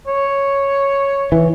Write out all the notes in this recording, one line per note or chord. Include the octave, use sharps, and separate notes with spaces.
C#5
E3